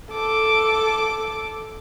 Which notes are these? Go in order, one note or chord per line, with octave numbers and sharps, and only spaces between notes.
A4 D6